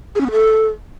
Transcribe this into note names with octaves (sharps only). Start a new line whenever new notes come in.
G#4
C#4
B3
A4